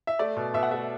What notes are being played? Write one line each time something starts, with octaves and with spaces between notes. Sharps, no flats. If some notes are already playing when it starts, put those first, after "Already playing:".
E5
A3 D5
B2
B2 E5
F#5
A3 E5